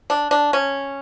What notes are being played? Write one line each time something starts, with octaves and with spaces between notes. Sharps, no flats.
D4
D4
C#4